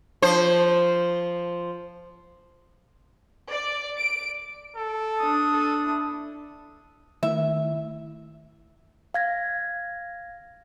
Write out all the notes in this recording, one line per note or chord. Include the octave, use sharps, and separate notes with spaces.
F3 C5
D5
D7
A4
D4 D#6
A4
E4
D#3 A3 E4 E5
F5 G#6 A#6